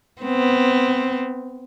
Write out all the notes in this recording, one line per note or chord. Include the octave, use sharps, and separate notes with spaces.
B3 C4